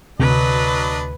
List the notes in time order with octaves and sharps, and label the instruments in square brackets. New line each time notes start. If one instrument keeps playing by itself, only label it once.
[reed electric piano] D2 [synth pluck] C3 [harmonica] F#3 D4 D#5 [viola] B4